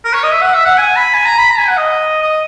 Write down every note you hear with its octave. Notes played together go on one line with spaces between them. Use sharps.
A#4
C#5
D#5
E5
F#5
E5
F#5
G#5
B5
G#5
A#5
B5
A#5
G#5
F#5
D#5
D#5